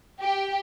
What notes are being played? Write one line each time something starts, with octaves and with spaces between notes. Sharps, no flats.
G4